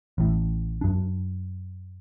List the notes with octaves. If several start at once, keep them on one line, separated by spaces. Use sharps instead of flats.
A1 A2
F#2 D4